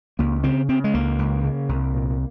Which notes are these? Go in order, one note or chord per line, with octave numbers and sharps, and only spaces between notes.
C#2 A#3
C#3 C4
C#3 C4
G#3
C#2 A#3
C#2
C#3
C2
A#2